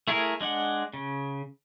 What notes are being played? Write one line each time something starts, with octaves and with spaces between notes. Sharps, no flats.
A3 E4 G#4 A#4
G#3 D4 F#5
C#3